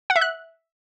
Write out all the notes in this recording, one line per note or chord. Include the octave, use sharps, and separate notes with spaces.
F#5
E5
F#6